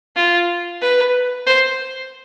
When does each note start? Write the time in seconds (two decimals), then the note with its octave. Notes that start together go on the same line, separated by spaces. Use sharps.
0.16 F4
0.81 B4
1.47 C5